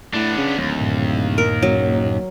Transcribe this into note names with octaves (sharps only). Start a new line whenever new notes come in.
A2 B3 D4
C#3
D1 D#2
G2 A#2
A#4
F#1 F#3